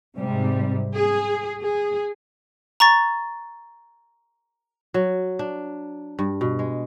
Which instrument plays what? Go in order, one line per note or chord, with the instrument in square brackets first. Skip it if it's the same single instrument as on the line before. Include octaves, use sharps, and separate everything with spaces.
[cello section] G#2 C3 G3
G#4
G#4
[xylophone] A#5 C#6 A6
[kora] F#3
D4
G2
B2
G#3